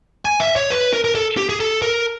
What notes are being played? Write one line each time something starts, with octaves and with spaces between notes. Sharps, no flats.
G#5
E5
C#5
B4
A#4
A#4
A4
G4
G#4
A4
A#4